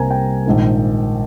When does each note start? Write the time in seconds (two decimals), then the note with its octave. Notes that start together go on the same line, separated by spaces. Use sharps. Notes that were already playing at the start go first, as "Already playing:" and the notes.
Already playing: C2 C3 G3 A#3 G#5 A#5
0.11 G5
0.46 A#1 G#2 D#3 A#3